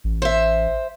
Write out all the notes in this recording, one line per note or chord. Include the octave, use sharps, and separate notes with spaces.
A1
C5 E5